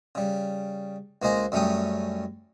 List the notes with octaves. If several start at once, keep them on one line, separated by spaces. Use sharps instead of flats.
C#3 G3
C#2 A#3 C5 D#5 G#5 A#5
F#2 G3 A3 C#4 G5 D#6